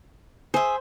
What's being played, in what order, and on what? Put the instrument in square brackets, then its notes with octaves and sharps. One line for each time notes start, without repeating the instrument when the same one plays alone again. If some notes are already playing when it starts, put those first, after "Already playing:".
[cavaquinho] G#4 E5 [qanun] C5